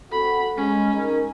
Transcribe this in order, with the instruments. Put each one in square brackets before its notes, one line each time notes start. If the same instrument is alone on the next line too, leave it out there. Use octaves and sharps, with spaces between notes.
[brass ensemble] C4 F#4 A4 [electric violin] B5
[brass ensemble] G#3 [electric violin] C#4
[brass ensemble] D#4 A#4